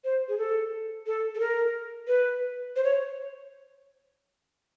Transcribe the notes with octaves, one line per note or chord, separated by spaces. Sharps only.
C5
G#4
A4
A4
A4
A#4
B4
C5
C#5